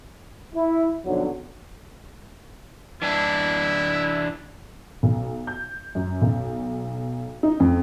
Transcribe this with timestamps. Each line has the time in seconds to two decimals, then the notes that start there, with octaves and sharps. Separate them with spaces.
0.55 E4
1.05 B1 F2 D3 F#3
3.02 E3 D4 E4
5.03 B1
5.47 G6
5.95 F#2
6.22 B1
7.43 D#4
7.60 F2